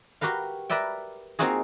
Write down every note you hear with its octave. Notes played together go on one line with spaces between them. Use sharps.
F#4 G4 A#4 B4 F5
A#4 B4 D5 E5 G5
A#3 C4 D#4 F4 F#4 G#4